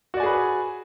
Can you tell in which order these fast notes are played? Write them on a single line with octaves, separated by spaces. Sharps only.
F#4 D5 G#5 G#4 B4